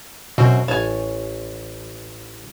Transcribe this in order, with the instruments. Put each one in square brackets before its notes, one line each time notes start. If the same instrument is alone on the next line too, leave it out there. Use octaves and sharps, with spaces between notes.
[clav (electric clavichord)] F#2 C4 [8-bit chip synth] B2 [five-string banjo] F#4
[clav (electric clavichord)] A1 A5 [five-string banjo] C#5 G#5